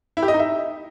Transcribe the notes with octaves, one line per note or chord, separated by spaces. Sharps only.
E4
G4
D#5
D#4
E5